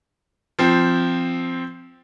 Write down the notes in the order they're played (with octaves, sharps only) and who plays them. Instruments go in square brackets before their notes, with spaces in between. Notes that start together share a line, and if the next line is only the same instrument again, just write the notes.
[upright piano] F3 C4